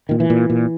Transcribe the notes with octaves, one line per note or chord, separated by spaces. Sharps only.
A#2 D#3
E3
A#2
A#2